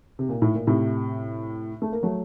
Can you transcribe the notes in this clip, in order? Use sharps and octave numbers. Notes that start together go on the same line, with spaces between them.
C3
A#2
A2
A#2
A2 C3
A3
A#3
F#3 A3